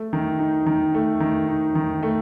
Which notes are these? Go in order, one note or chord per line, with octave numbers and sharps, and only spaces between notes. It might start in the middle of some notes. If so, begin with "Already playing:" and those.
Already playing: A3
D#3
D#4
D#3
A3
D#3
D#4
D#3
A3